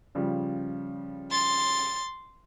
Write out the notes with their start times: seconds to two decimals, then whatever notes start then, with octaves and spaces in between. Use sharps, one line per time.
0.15 C#3 F3 G3
1.31 C6 A6